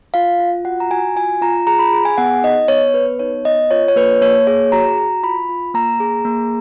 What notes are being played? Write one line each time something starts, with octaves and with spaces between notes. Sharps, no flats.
F4 F5
F4
F#4 F#5
A#5
F#4 G#5
F4 G#5
F4 A#5
G#4 A#5
B5
G#4
G#5
B3 F#5
D#4 D#5
B3 C#5
B3 B4
D#4 C#5
B3 D#5
F4 C#5
C#5
A#3 B4
A#3 C#5
G#4 C#5
F#4 A#5
F#4 A#5
F4 B5
F4
A#3 A#5
G#4
A#3